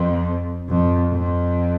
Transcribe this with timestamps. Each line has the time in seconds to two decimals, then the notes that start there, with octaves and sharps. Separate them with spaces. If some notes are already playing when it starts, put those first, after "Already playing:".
Already playing: F2
0.70 F2
1.12 F2